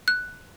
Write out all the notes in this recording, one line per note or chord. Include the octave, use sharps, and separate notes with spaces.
F#6